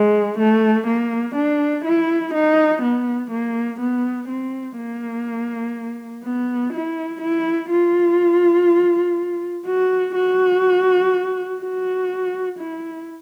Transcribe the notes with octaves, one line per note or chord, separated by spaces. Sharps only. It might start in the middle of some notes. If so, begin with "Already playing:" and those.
Already playing: G#3
A3
A#3
D4
E4
D#4
B3
A#3
B3
C4
A#3
B3
E4
E4
F4
F#4
F#4
F#4
E4